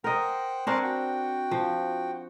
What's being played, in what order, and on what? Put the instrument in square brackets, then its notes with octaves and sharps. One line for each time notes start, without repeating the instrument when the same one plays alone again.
[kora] A#4 D#5 [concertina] C5 F#5 G5
[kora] C4 D4 A#4 [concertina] G#5 C6 C#6
[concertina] F#4 G5
[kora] F3